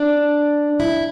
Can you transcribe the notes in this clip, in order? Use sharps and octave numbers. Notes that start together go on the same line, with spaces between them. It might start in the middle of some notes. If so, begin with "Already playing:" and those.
Already playing: D4
E4